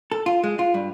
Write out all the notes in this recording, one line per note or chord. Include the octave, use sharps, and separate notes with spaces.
A4
F4
G#3
F4
G2